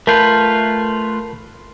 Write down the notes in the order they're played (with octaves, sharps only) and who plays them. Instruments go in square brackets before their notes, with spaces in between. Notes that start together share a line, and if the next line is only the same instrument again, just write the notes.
[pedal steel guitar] A3 F4 B4 [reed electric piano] A#4 A5 G6